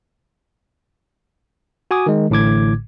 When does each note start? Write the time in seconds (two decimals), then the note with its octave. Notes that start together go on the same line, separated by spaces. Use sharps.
1.91 F#4 G#5 D6 D#6
2.06 D#3 G#3
2.30 A1 A2 D3 D6 G#6